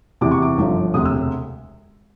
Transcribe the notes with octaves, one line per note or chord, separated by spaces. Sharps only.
E2 C3 E3 D6
C#6
D6
G1 F#2 D3 F3
E1 D2 C3 D#6
E6